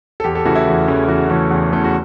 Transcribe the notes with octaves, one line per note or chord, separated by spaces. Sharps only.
A4
E2 G4
A4
C#3 E3 A3 C#4 F#4
E4
E2
C#3 E3 A3 C#4
E2 F#4
C#3 E3 A3 C#4
E2
C#3 E3 A3 C#4
F#4